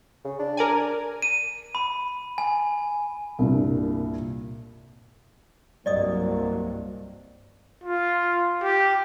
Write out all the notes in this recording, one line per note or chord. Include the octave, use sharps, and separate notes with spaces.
C#3
D4
A#4 D5 G#5
D#7
B5
G#5
C2 G2 A#2
C2 G2 F#3 A#3 D5 D#5 D#6
F4
G4